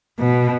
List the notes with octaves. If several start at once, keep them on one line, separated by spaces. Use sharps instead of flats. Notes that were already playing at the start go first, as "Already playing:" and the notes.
B2